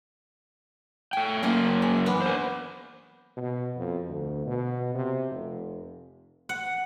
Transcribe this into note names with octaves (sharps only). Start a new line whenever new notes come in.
A3 G5 G#5
F#2 A#3 C#4 F4 D#5
G#3
E3 B3 D4
A#4 C5
B2
F2
D2
B2
C3
F1
F#5